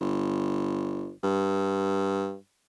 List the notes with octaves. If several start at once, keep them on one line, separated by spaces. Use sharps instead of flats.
G1
G2